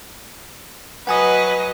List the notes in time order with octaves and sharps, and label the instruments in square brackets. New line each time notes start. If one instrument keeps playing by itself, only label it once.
[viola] F#3 D#5 [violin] B4 [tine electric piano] F#5 G#5 D#6